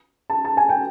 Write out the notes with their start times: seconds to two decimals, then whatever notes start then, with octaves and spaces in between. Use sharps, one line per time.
0.30 A5
0.45 A5
0.57 G#5
0.69 G5